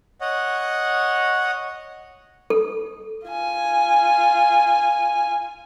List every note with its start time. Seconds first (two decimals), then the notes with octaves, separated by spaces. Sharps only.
0.21 C#5 D#5 F#5
2.50 A4
3.28 F4 G#5